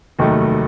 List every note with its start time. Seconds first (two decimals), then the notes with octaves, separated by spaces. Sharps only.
0.19 F1 D#2 D#3 F#3 A3